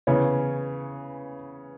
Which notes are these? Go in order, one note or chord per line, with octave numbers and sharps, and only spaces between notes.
C#3 E3 B3 C#5